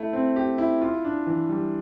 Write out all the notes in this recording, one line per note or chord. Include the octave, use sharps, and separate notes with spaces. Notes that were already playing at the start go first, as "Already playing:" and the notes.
Already playing: A3 E4
C4
G4
E4
F4
D4
E3
G3